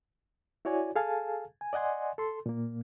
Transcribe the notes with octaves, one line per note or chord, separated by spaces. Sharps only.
E4 F#4 C#5 D5 G#5
G#4 A4 F5 G#5 A5
G#5
D5 D#5 F#5 G#5 C6
A4 C6
A#2 A#3